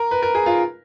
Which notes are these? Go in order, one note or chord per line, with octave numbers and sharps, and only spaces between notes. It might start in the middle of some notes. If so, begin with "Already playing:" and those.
Already playing: A#4
B4
A#4
G#4
F4